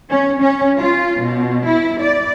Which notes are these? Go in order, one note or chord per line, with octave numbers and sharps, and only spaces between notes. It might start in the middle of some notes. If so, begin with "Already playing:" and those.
C#4
C#4
F4
B2
E4
D5